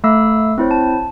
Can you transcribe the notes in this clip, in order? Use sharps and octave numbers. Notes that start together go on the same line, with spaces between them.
A3 F5 B5 E6
C4 E4 C5 C#5
A5